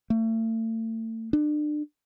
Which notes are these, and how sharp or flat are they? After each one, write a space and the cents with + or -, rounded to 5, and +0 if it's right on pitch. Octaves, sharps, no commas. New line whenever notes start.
A3 +35
D4 +35